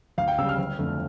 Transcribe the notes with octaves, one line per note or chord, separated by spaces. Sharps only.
D2 F5
G5
C#3 G3 E6
F6
G1
F2 D3 A3